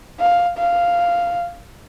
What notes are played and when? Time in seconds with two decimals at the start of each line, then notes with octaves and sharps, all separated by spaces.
0.20 F5
0.58 F5